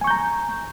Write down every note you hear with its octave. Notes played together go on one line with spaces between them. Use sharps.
G#5 A#5 C#6 G6